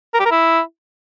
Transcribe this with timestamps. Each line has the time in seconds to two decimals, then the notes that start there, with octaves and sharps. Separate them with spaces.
0.14 A#4
0.20 G4
0.26 A#4
0.31 E4